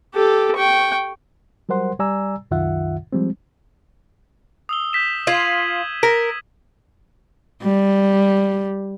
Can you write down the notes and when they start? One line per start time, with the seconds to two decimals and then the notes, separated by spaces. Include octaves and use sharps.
0.15 G4 A4
0.56 G5 C#6
1.69 F#3 G3 A#4 C5 F#5 C6
1.99 G3 D5 G#5 A#5 E6
2.51 C2 F#2 D#3 F4 E5 F#5
3.13 F3 G3 G#3 C4
4.69 D#6 E6 G7
4.93 G6 B6 E7
5.27 F4 G#6 D#7 F#7
6.03 A#4 B6
7.63 G3